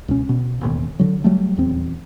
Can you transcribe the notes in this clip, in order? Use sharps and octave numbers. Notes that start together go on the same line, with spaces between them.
C#2 B2 C#4
B2
E1 A1 D#2 B2
D3 F#3
F#3 G3 A3
D#1 E2 C4